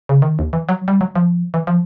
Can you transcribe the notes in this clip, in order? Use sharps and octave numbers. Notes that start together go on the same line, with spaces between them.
C#3
D#3
D#2
E3
F#3
G3
F#3
F3
E3
F3